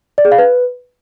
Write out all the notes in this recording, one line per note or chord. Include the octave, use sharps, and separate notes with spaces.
D5
G#4
F5
B4